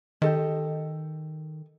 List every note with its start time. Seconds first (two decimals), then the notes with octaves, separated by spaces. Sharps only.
0.22 D#3 G4 A4 D#5